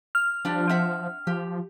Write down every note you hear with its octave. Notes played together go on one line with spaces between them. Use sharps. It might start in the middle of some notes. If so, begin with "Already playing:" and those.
F6
F3 G3 D4
C4 E5 F#5
F3 G4